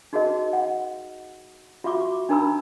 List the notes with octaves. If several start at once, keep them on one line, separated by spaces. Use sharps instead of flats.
D#4 F#4 G#4 A#4 D#5
F#5
F4 F#4 E5 C#6 D6
D4 D#4 A#4 A#5 B5 E6